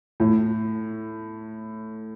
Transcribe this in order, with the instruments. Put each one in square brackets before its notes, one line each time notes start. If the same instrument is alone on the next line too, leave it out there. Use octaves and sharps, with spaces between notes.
[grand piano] A2